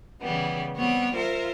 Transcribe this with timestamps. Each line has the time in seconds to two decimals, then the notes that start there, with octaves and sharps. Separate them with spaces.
0.21 C#3 E3 G3 B3
0.76 G3 B3 C4 C#5 F#5
1.13 F4 A#4 C5 E5